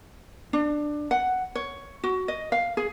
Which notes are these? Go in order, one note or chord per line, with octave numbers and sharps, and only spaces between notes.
D4
F#5
C#5
F#4
D#5
F5
G#4